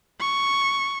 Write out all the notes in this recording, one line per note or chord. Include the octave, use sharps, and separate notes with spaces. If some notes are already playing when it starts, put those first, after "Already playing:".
C#6